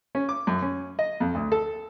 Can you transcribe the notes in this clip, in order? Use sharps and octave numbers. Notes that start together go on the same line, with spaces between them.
C#4
D6
F#2
C#4
D#5
F2
D2
A4